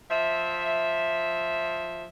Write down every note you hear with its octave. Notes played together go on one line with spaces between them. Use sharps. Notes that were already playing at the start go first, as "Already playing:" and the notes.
F3 E5